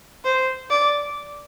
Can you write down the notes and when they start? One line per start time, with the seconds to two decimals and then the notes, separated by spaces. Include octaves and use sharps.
0.24 C5
0.70 D5